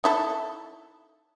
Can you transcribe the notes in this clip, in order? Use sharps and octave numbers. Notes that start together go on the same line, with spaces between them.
D#4 E4 A4